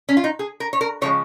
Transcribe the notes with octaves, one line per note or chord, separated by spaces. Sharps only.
C#4
F4
D#4
G#4
A#4
C#5
A#4
C#3 F3 G#3 C#5